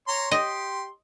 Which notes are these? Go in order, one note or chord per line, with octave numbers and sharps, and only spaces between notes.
C#5 A#5 C6
G4 D#5 C6